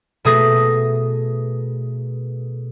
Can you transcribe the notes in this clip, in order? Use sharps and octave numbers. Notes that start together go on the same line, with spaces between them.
B2 A3 G#4 D#6 A#6 B6